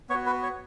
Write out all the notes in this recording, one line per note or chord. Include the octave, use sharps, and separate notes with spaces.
B3 F#4 C#5 C#6
B4 B5
C#5 C#6